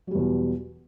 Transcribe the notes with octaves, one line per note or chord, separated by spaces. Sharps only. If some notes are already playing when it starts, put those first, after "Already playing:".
E2 B2 F#3 G3